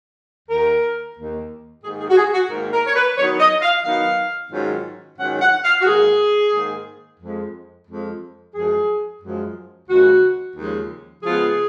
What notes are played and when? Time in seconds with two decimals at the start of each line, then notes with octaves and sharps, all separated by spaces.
0.49 D#2 D#3 A#3 A#4
1.16 D#2 D#3 A#3
1.84 G#2 D#3 A#3 G#4
2.00 G#4
2.09 F#4
2.17 G#4
2.34 F#4
2.51 G#2 D#3 A#3 A#4
2.73 A#4
2.87 C#5
2.96 B4
3.18 D#3 F#3 B3 D#4 C#5
3.40 D#5
3.62 F5
3.85 D#3 F#3 B3 D#4 F5
4.52 G#2 D#3 F#3 C#4 F4
5.19 G#2 D#3 F#3 C#4 F4 F#5
5.42 F#5
5.65 F5
5.81 F#4
5.86 G#2 D#3 A#3 G#4
6.53 G#2 D#3 A#3
7.20 F2 F3 G#3
7.88 F2 F3 G#3
8.54 F#2 F3 G#3 G#4
9.22 F#2 F3 G#3
9.89 D#2 C#3 F3 G#3 F#4
10.56 D#2 C#3 F3 G#3
11.23 C#3 F3 G#3 B3 F4 G#4